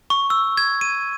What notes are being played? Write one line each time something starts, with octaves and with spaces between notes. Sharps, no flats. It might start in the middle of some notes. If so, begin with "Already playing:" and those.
C#6
E6
G#6
D#7